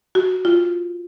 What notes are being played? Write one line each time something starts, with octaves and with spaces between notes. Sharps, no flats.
F#4
F4